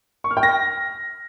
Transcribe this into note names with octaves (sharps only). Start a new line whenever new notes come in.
C#6
F6
G5
A#6